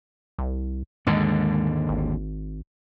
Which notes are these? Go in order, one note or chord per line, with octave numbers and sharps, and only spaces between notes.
C2
D#2 G#2 D3 G#3
G#1